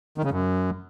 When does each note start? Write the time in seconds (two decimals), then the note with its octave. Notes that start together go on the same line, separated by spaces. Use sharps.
0.18 D#3
0.24 C#3
0.31 F#2